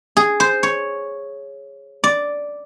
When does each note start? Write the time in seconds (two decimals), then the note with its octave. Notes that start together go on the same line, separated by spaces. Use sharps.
0.17 G#4
0.40 C5
0.63 C#5
2.04 D5